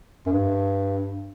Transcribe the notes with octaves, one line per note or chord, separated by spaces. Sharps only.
F#2
G2